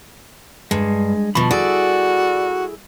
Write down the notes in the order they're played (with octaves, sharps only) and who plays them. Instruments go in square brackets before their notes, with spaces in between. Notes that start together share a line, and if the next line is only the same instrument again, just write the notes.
[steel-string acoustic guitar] G2 [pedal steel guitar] G#3
[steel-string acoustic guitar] B2 F3 [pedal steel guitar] B5 C#6
[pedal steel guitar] E4 G#4 A4 [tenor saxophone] F#4 [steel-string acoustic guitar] D5